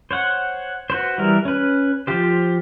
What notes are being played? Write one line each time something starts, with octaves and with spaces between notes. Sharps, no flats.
C5 C#5 F#5
F#4 B4 C5
E3 G3 A#4
C#4 B4
F3 F4 G4 C5